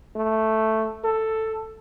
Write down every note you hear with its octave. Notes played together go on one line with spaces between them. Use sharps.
A3
A4